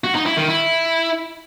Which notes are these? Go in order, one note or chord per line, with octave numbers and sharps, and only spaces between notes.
F#4
D#4
E4
D#3
E4